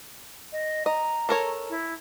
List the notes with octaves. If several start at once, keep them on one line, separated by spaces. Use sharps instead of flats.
D#5
D#5 A#5
A4 A#4 C#5
E4